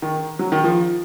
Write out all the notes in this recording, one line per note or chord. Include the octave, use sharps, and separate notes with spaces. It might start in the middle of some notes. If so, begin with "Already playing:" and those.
D#3
F#3
D#3
F3